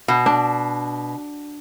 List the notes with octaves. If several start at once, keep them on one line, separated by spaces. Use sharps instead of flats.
B2
D4